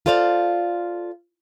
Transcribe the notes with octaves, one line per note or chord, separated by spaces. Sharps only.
F4 A4 C5 D5 F5